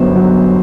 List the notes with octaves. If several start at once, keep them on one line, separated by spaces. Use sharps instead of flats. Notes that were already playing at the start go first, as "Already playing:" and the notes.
Already playing: G1 F#2 F#3 B3 C5
F#3